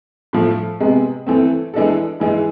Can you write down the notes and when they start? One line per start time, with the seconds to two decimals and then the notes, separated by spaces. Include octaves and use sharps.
0.33 A2 F3 A3
0.80 C3 G#3 B3
1.27 E3 A3 C4
1.74 E3 G#3 D4 A4
2.20 G#2 E3 G#3